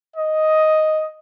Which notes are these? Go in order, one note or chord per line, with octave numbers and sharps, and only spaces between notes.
D#5